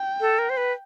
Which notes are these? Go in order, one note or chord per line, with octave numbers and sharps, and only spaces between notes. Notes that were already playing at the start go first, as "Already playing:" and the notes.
Already playing: G5
A4
A#4
C5
B4